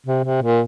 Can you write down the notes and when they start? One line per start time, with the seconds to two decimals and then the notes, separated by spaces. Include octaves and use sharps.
0.07 C3
0.25 C3
0.43 A#2